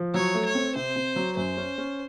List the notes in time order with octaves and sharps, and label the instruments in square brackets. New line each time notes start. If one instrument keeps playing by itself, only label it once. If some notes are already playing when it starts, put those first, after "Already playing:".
Already playing: [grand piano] F3
[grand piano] F#3 [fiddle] C#5
[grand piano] A3
[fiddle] C#5
[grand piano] C4
[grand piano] C3 [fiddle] C5
[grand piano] C3
F#3
[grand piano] F#2 [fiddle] C5
[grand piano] C#4
C#4